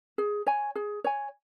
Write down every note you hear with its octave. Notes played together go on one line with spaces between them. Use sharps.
G#4
C#5 G#5
G#4
C#5 G#5